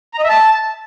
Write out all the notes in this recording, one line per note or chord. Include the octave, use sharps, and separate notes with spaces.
A#5
D#5
E5
A5